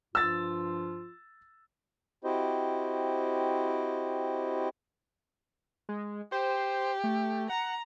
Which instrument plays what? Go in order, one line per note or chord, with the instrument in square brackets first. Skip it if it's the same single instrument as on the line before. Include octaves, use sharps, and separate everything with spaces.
[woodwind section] G2 F3 F4 [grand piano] E6 A6
[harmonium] C4 E4 F#4 G4 C5 D#5
[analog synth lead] G#3
[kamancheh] G4 [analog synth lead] C5
[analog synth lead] A3
[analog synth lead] F#5 [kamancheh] A#5